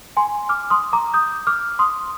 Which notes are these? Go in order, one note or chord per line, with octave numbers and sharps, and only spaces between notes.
G#5 C6
D6 F6
C6 D#6
A#5 D6
D#6 G6
D6 F6
C6 D#6